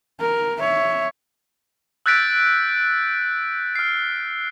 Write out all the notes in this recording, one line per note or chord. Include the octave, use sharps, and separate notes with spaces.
A#4
C#5 E5
E6 F#6 G6 A6 B6 D7
F6 C7